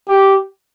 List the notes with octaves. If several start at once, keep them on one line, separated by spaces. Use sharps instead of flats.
G4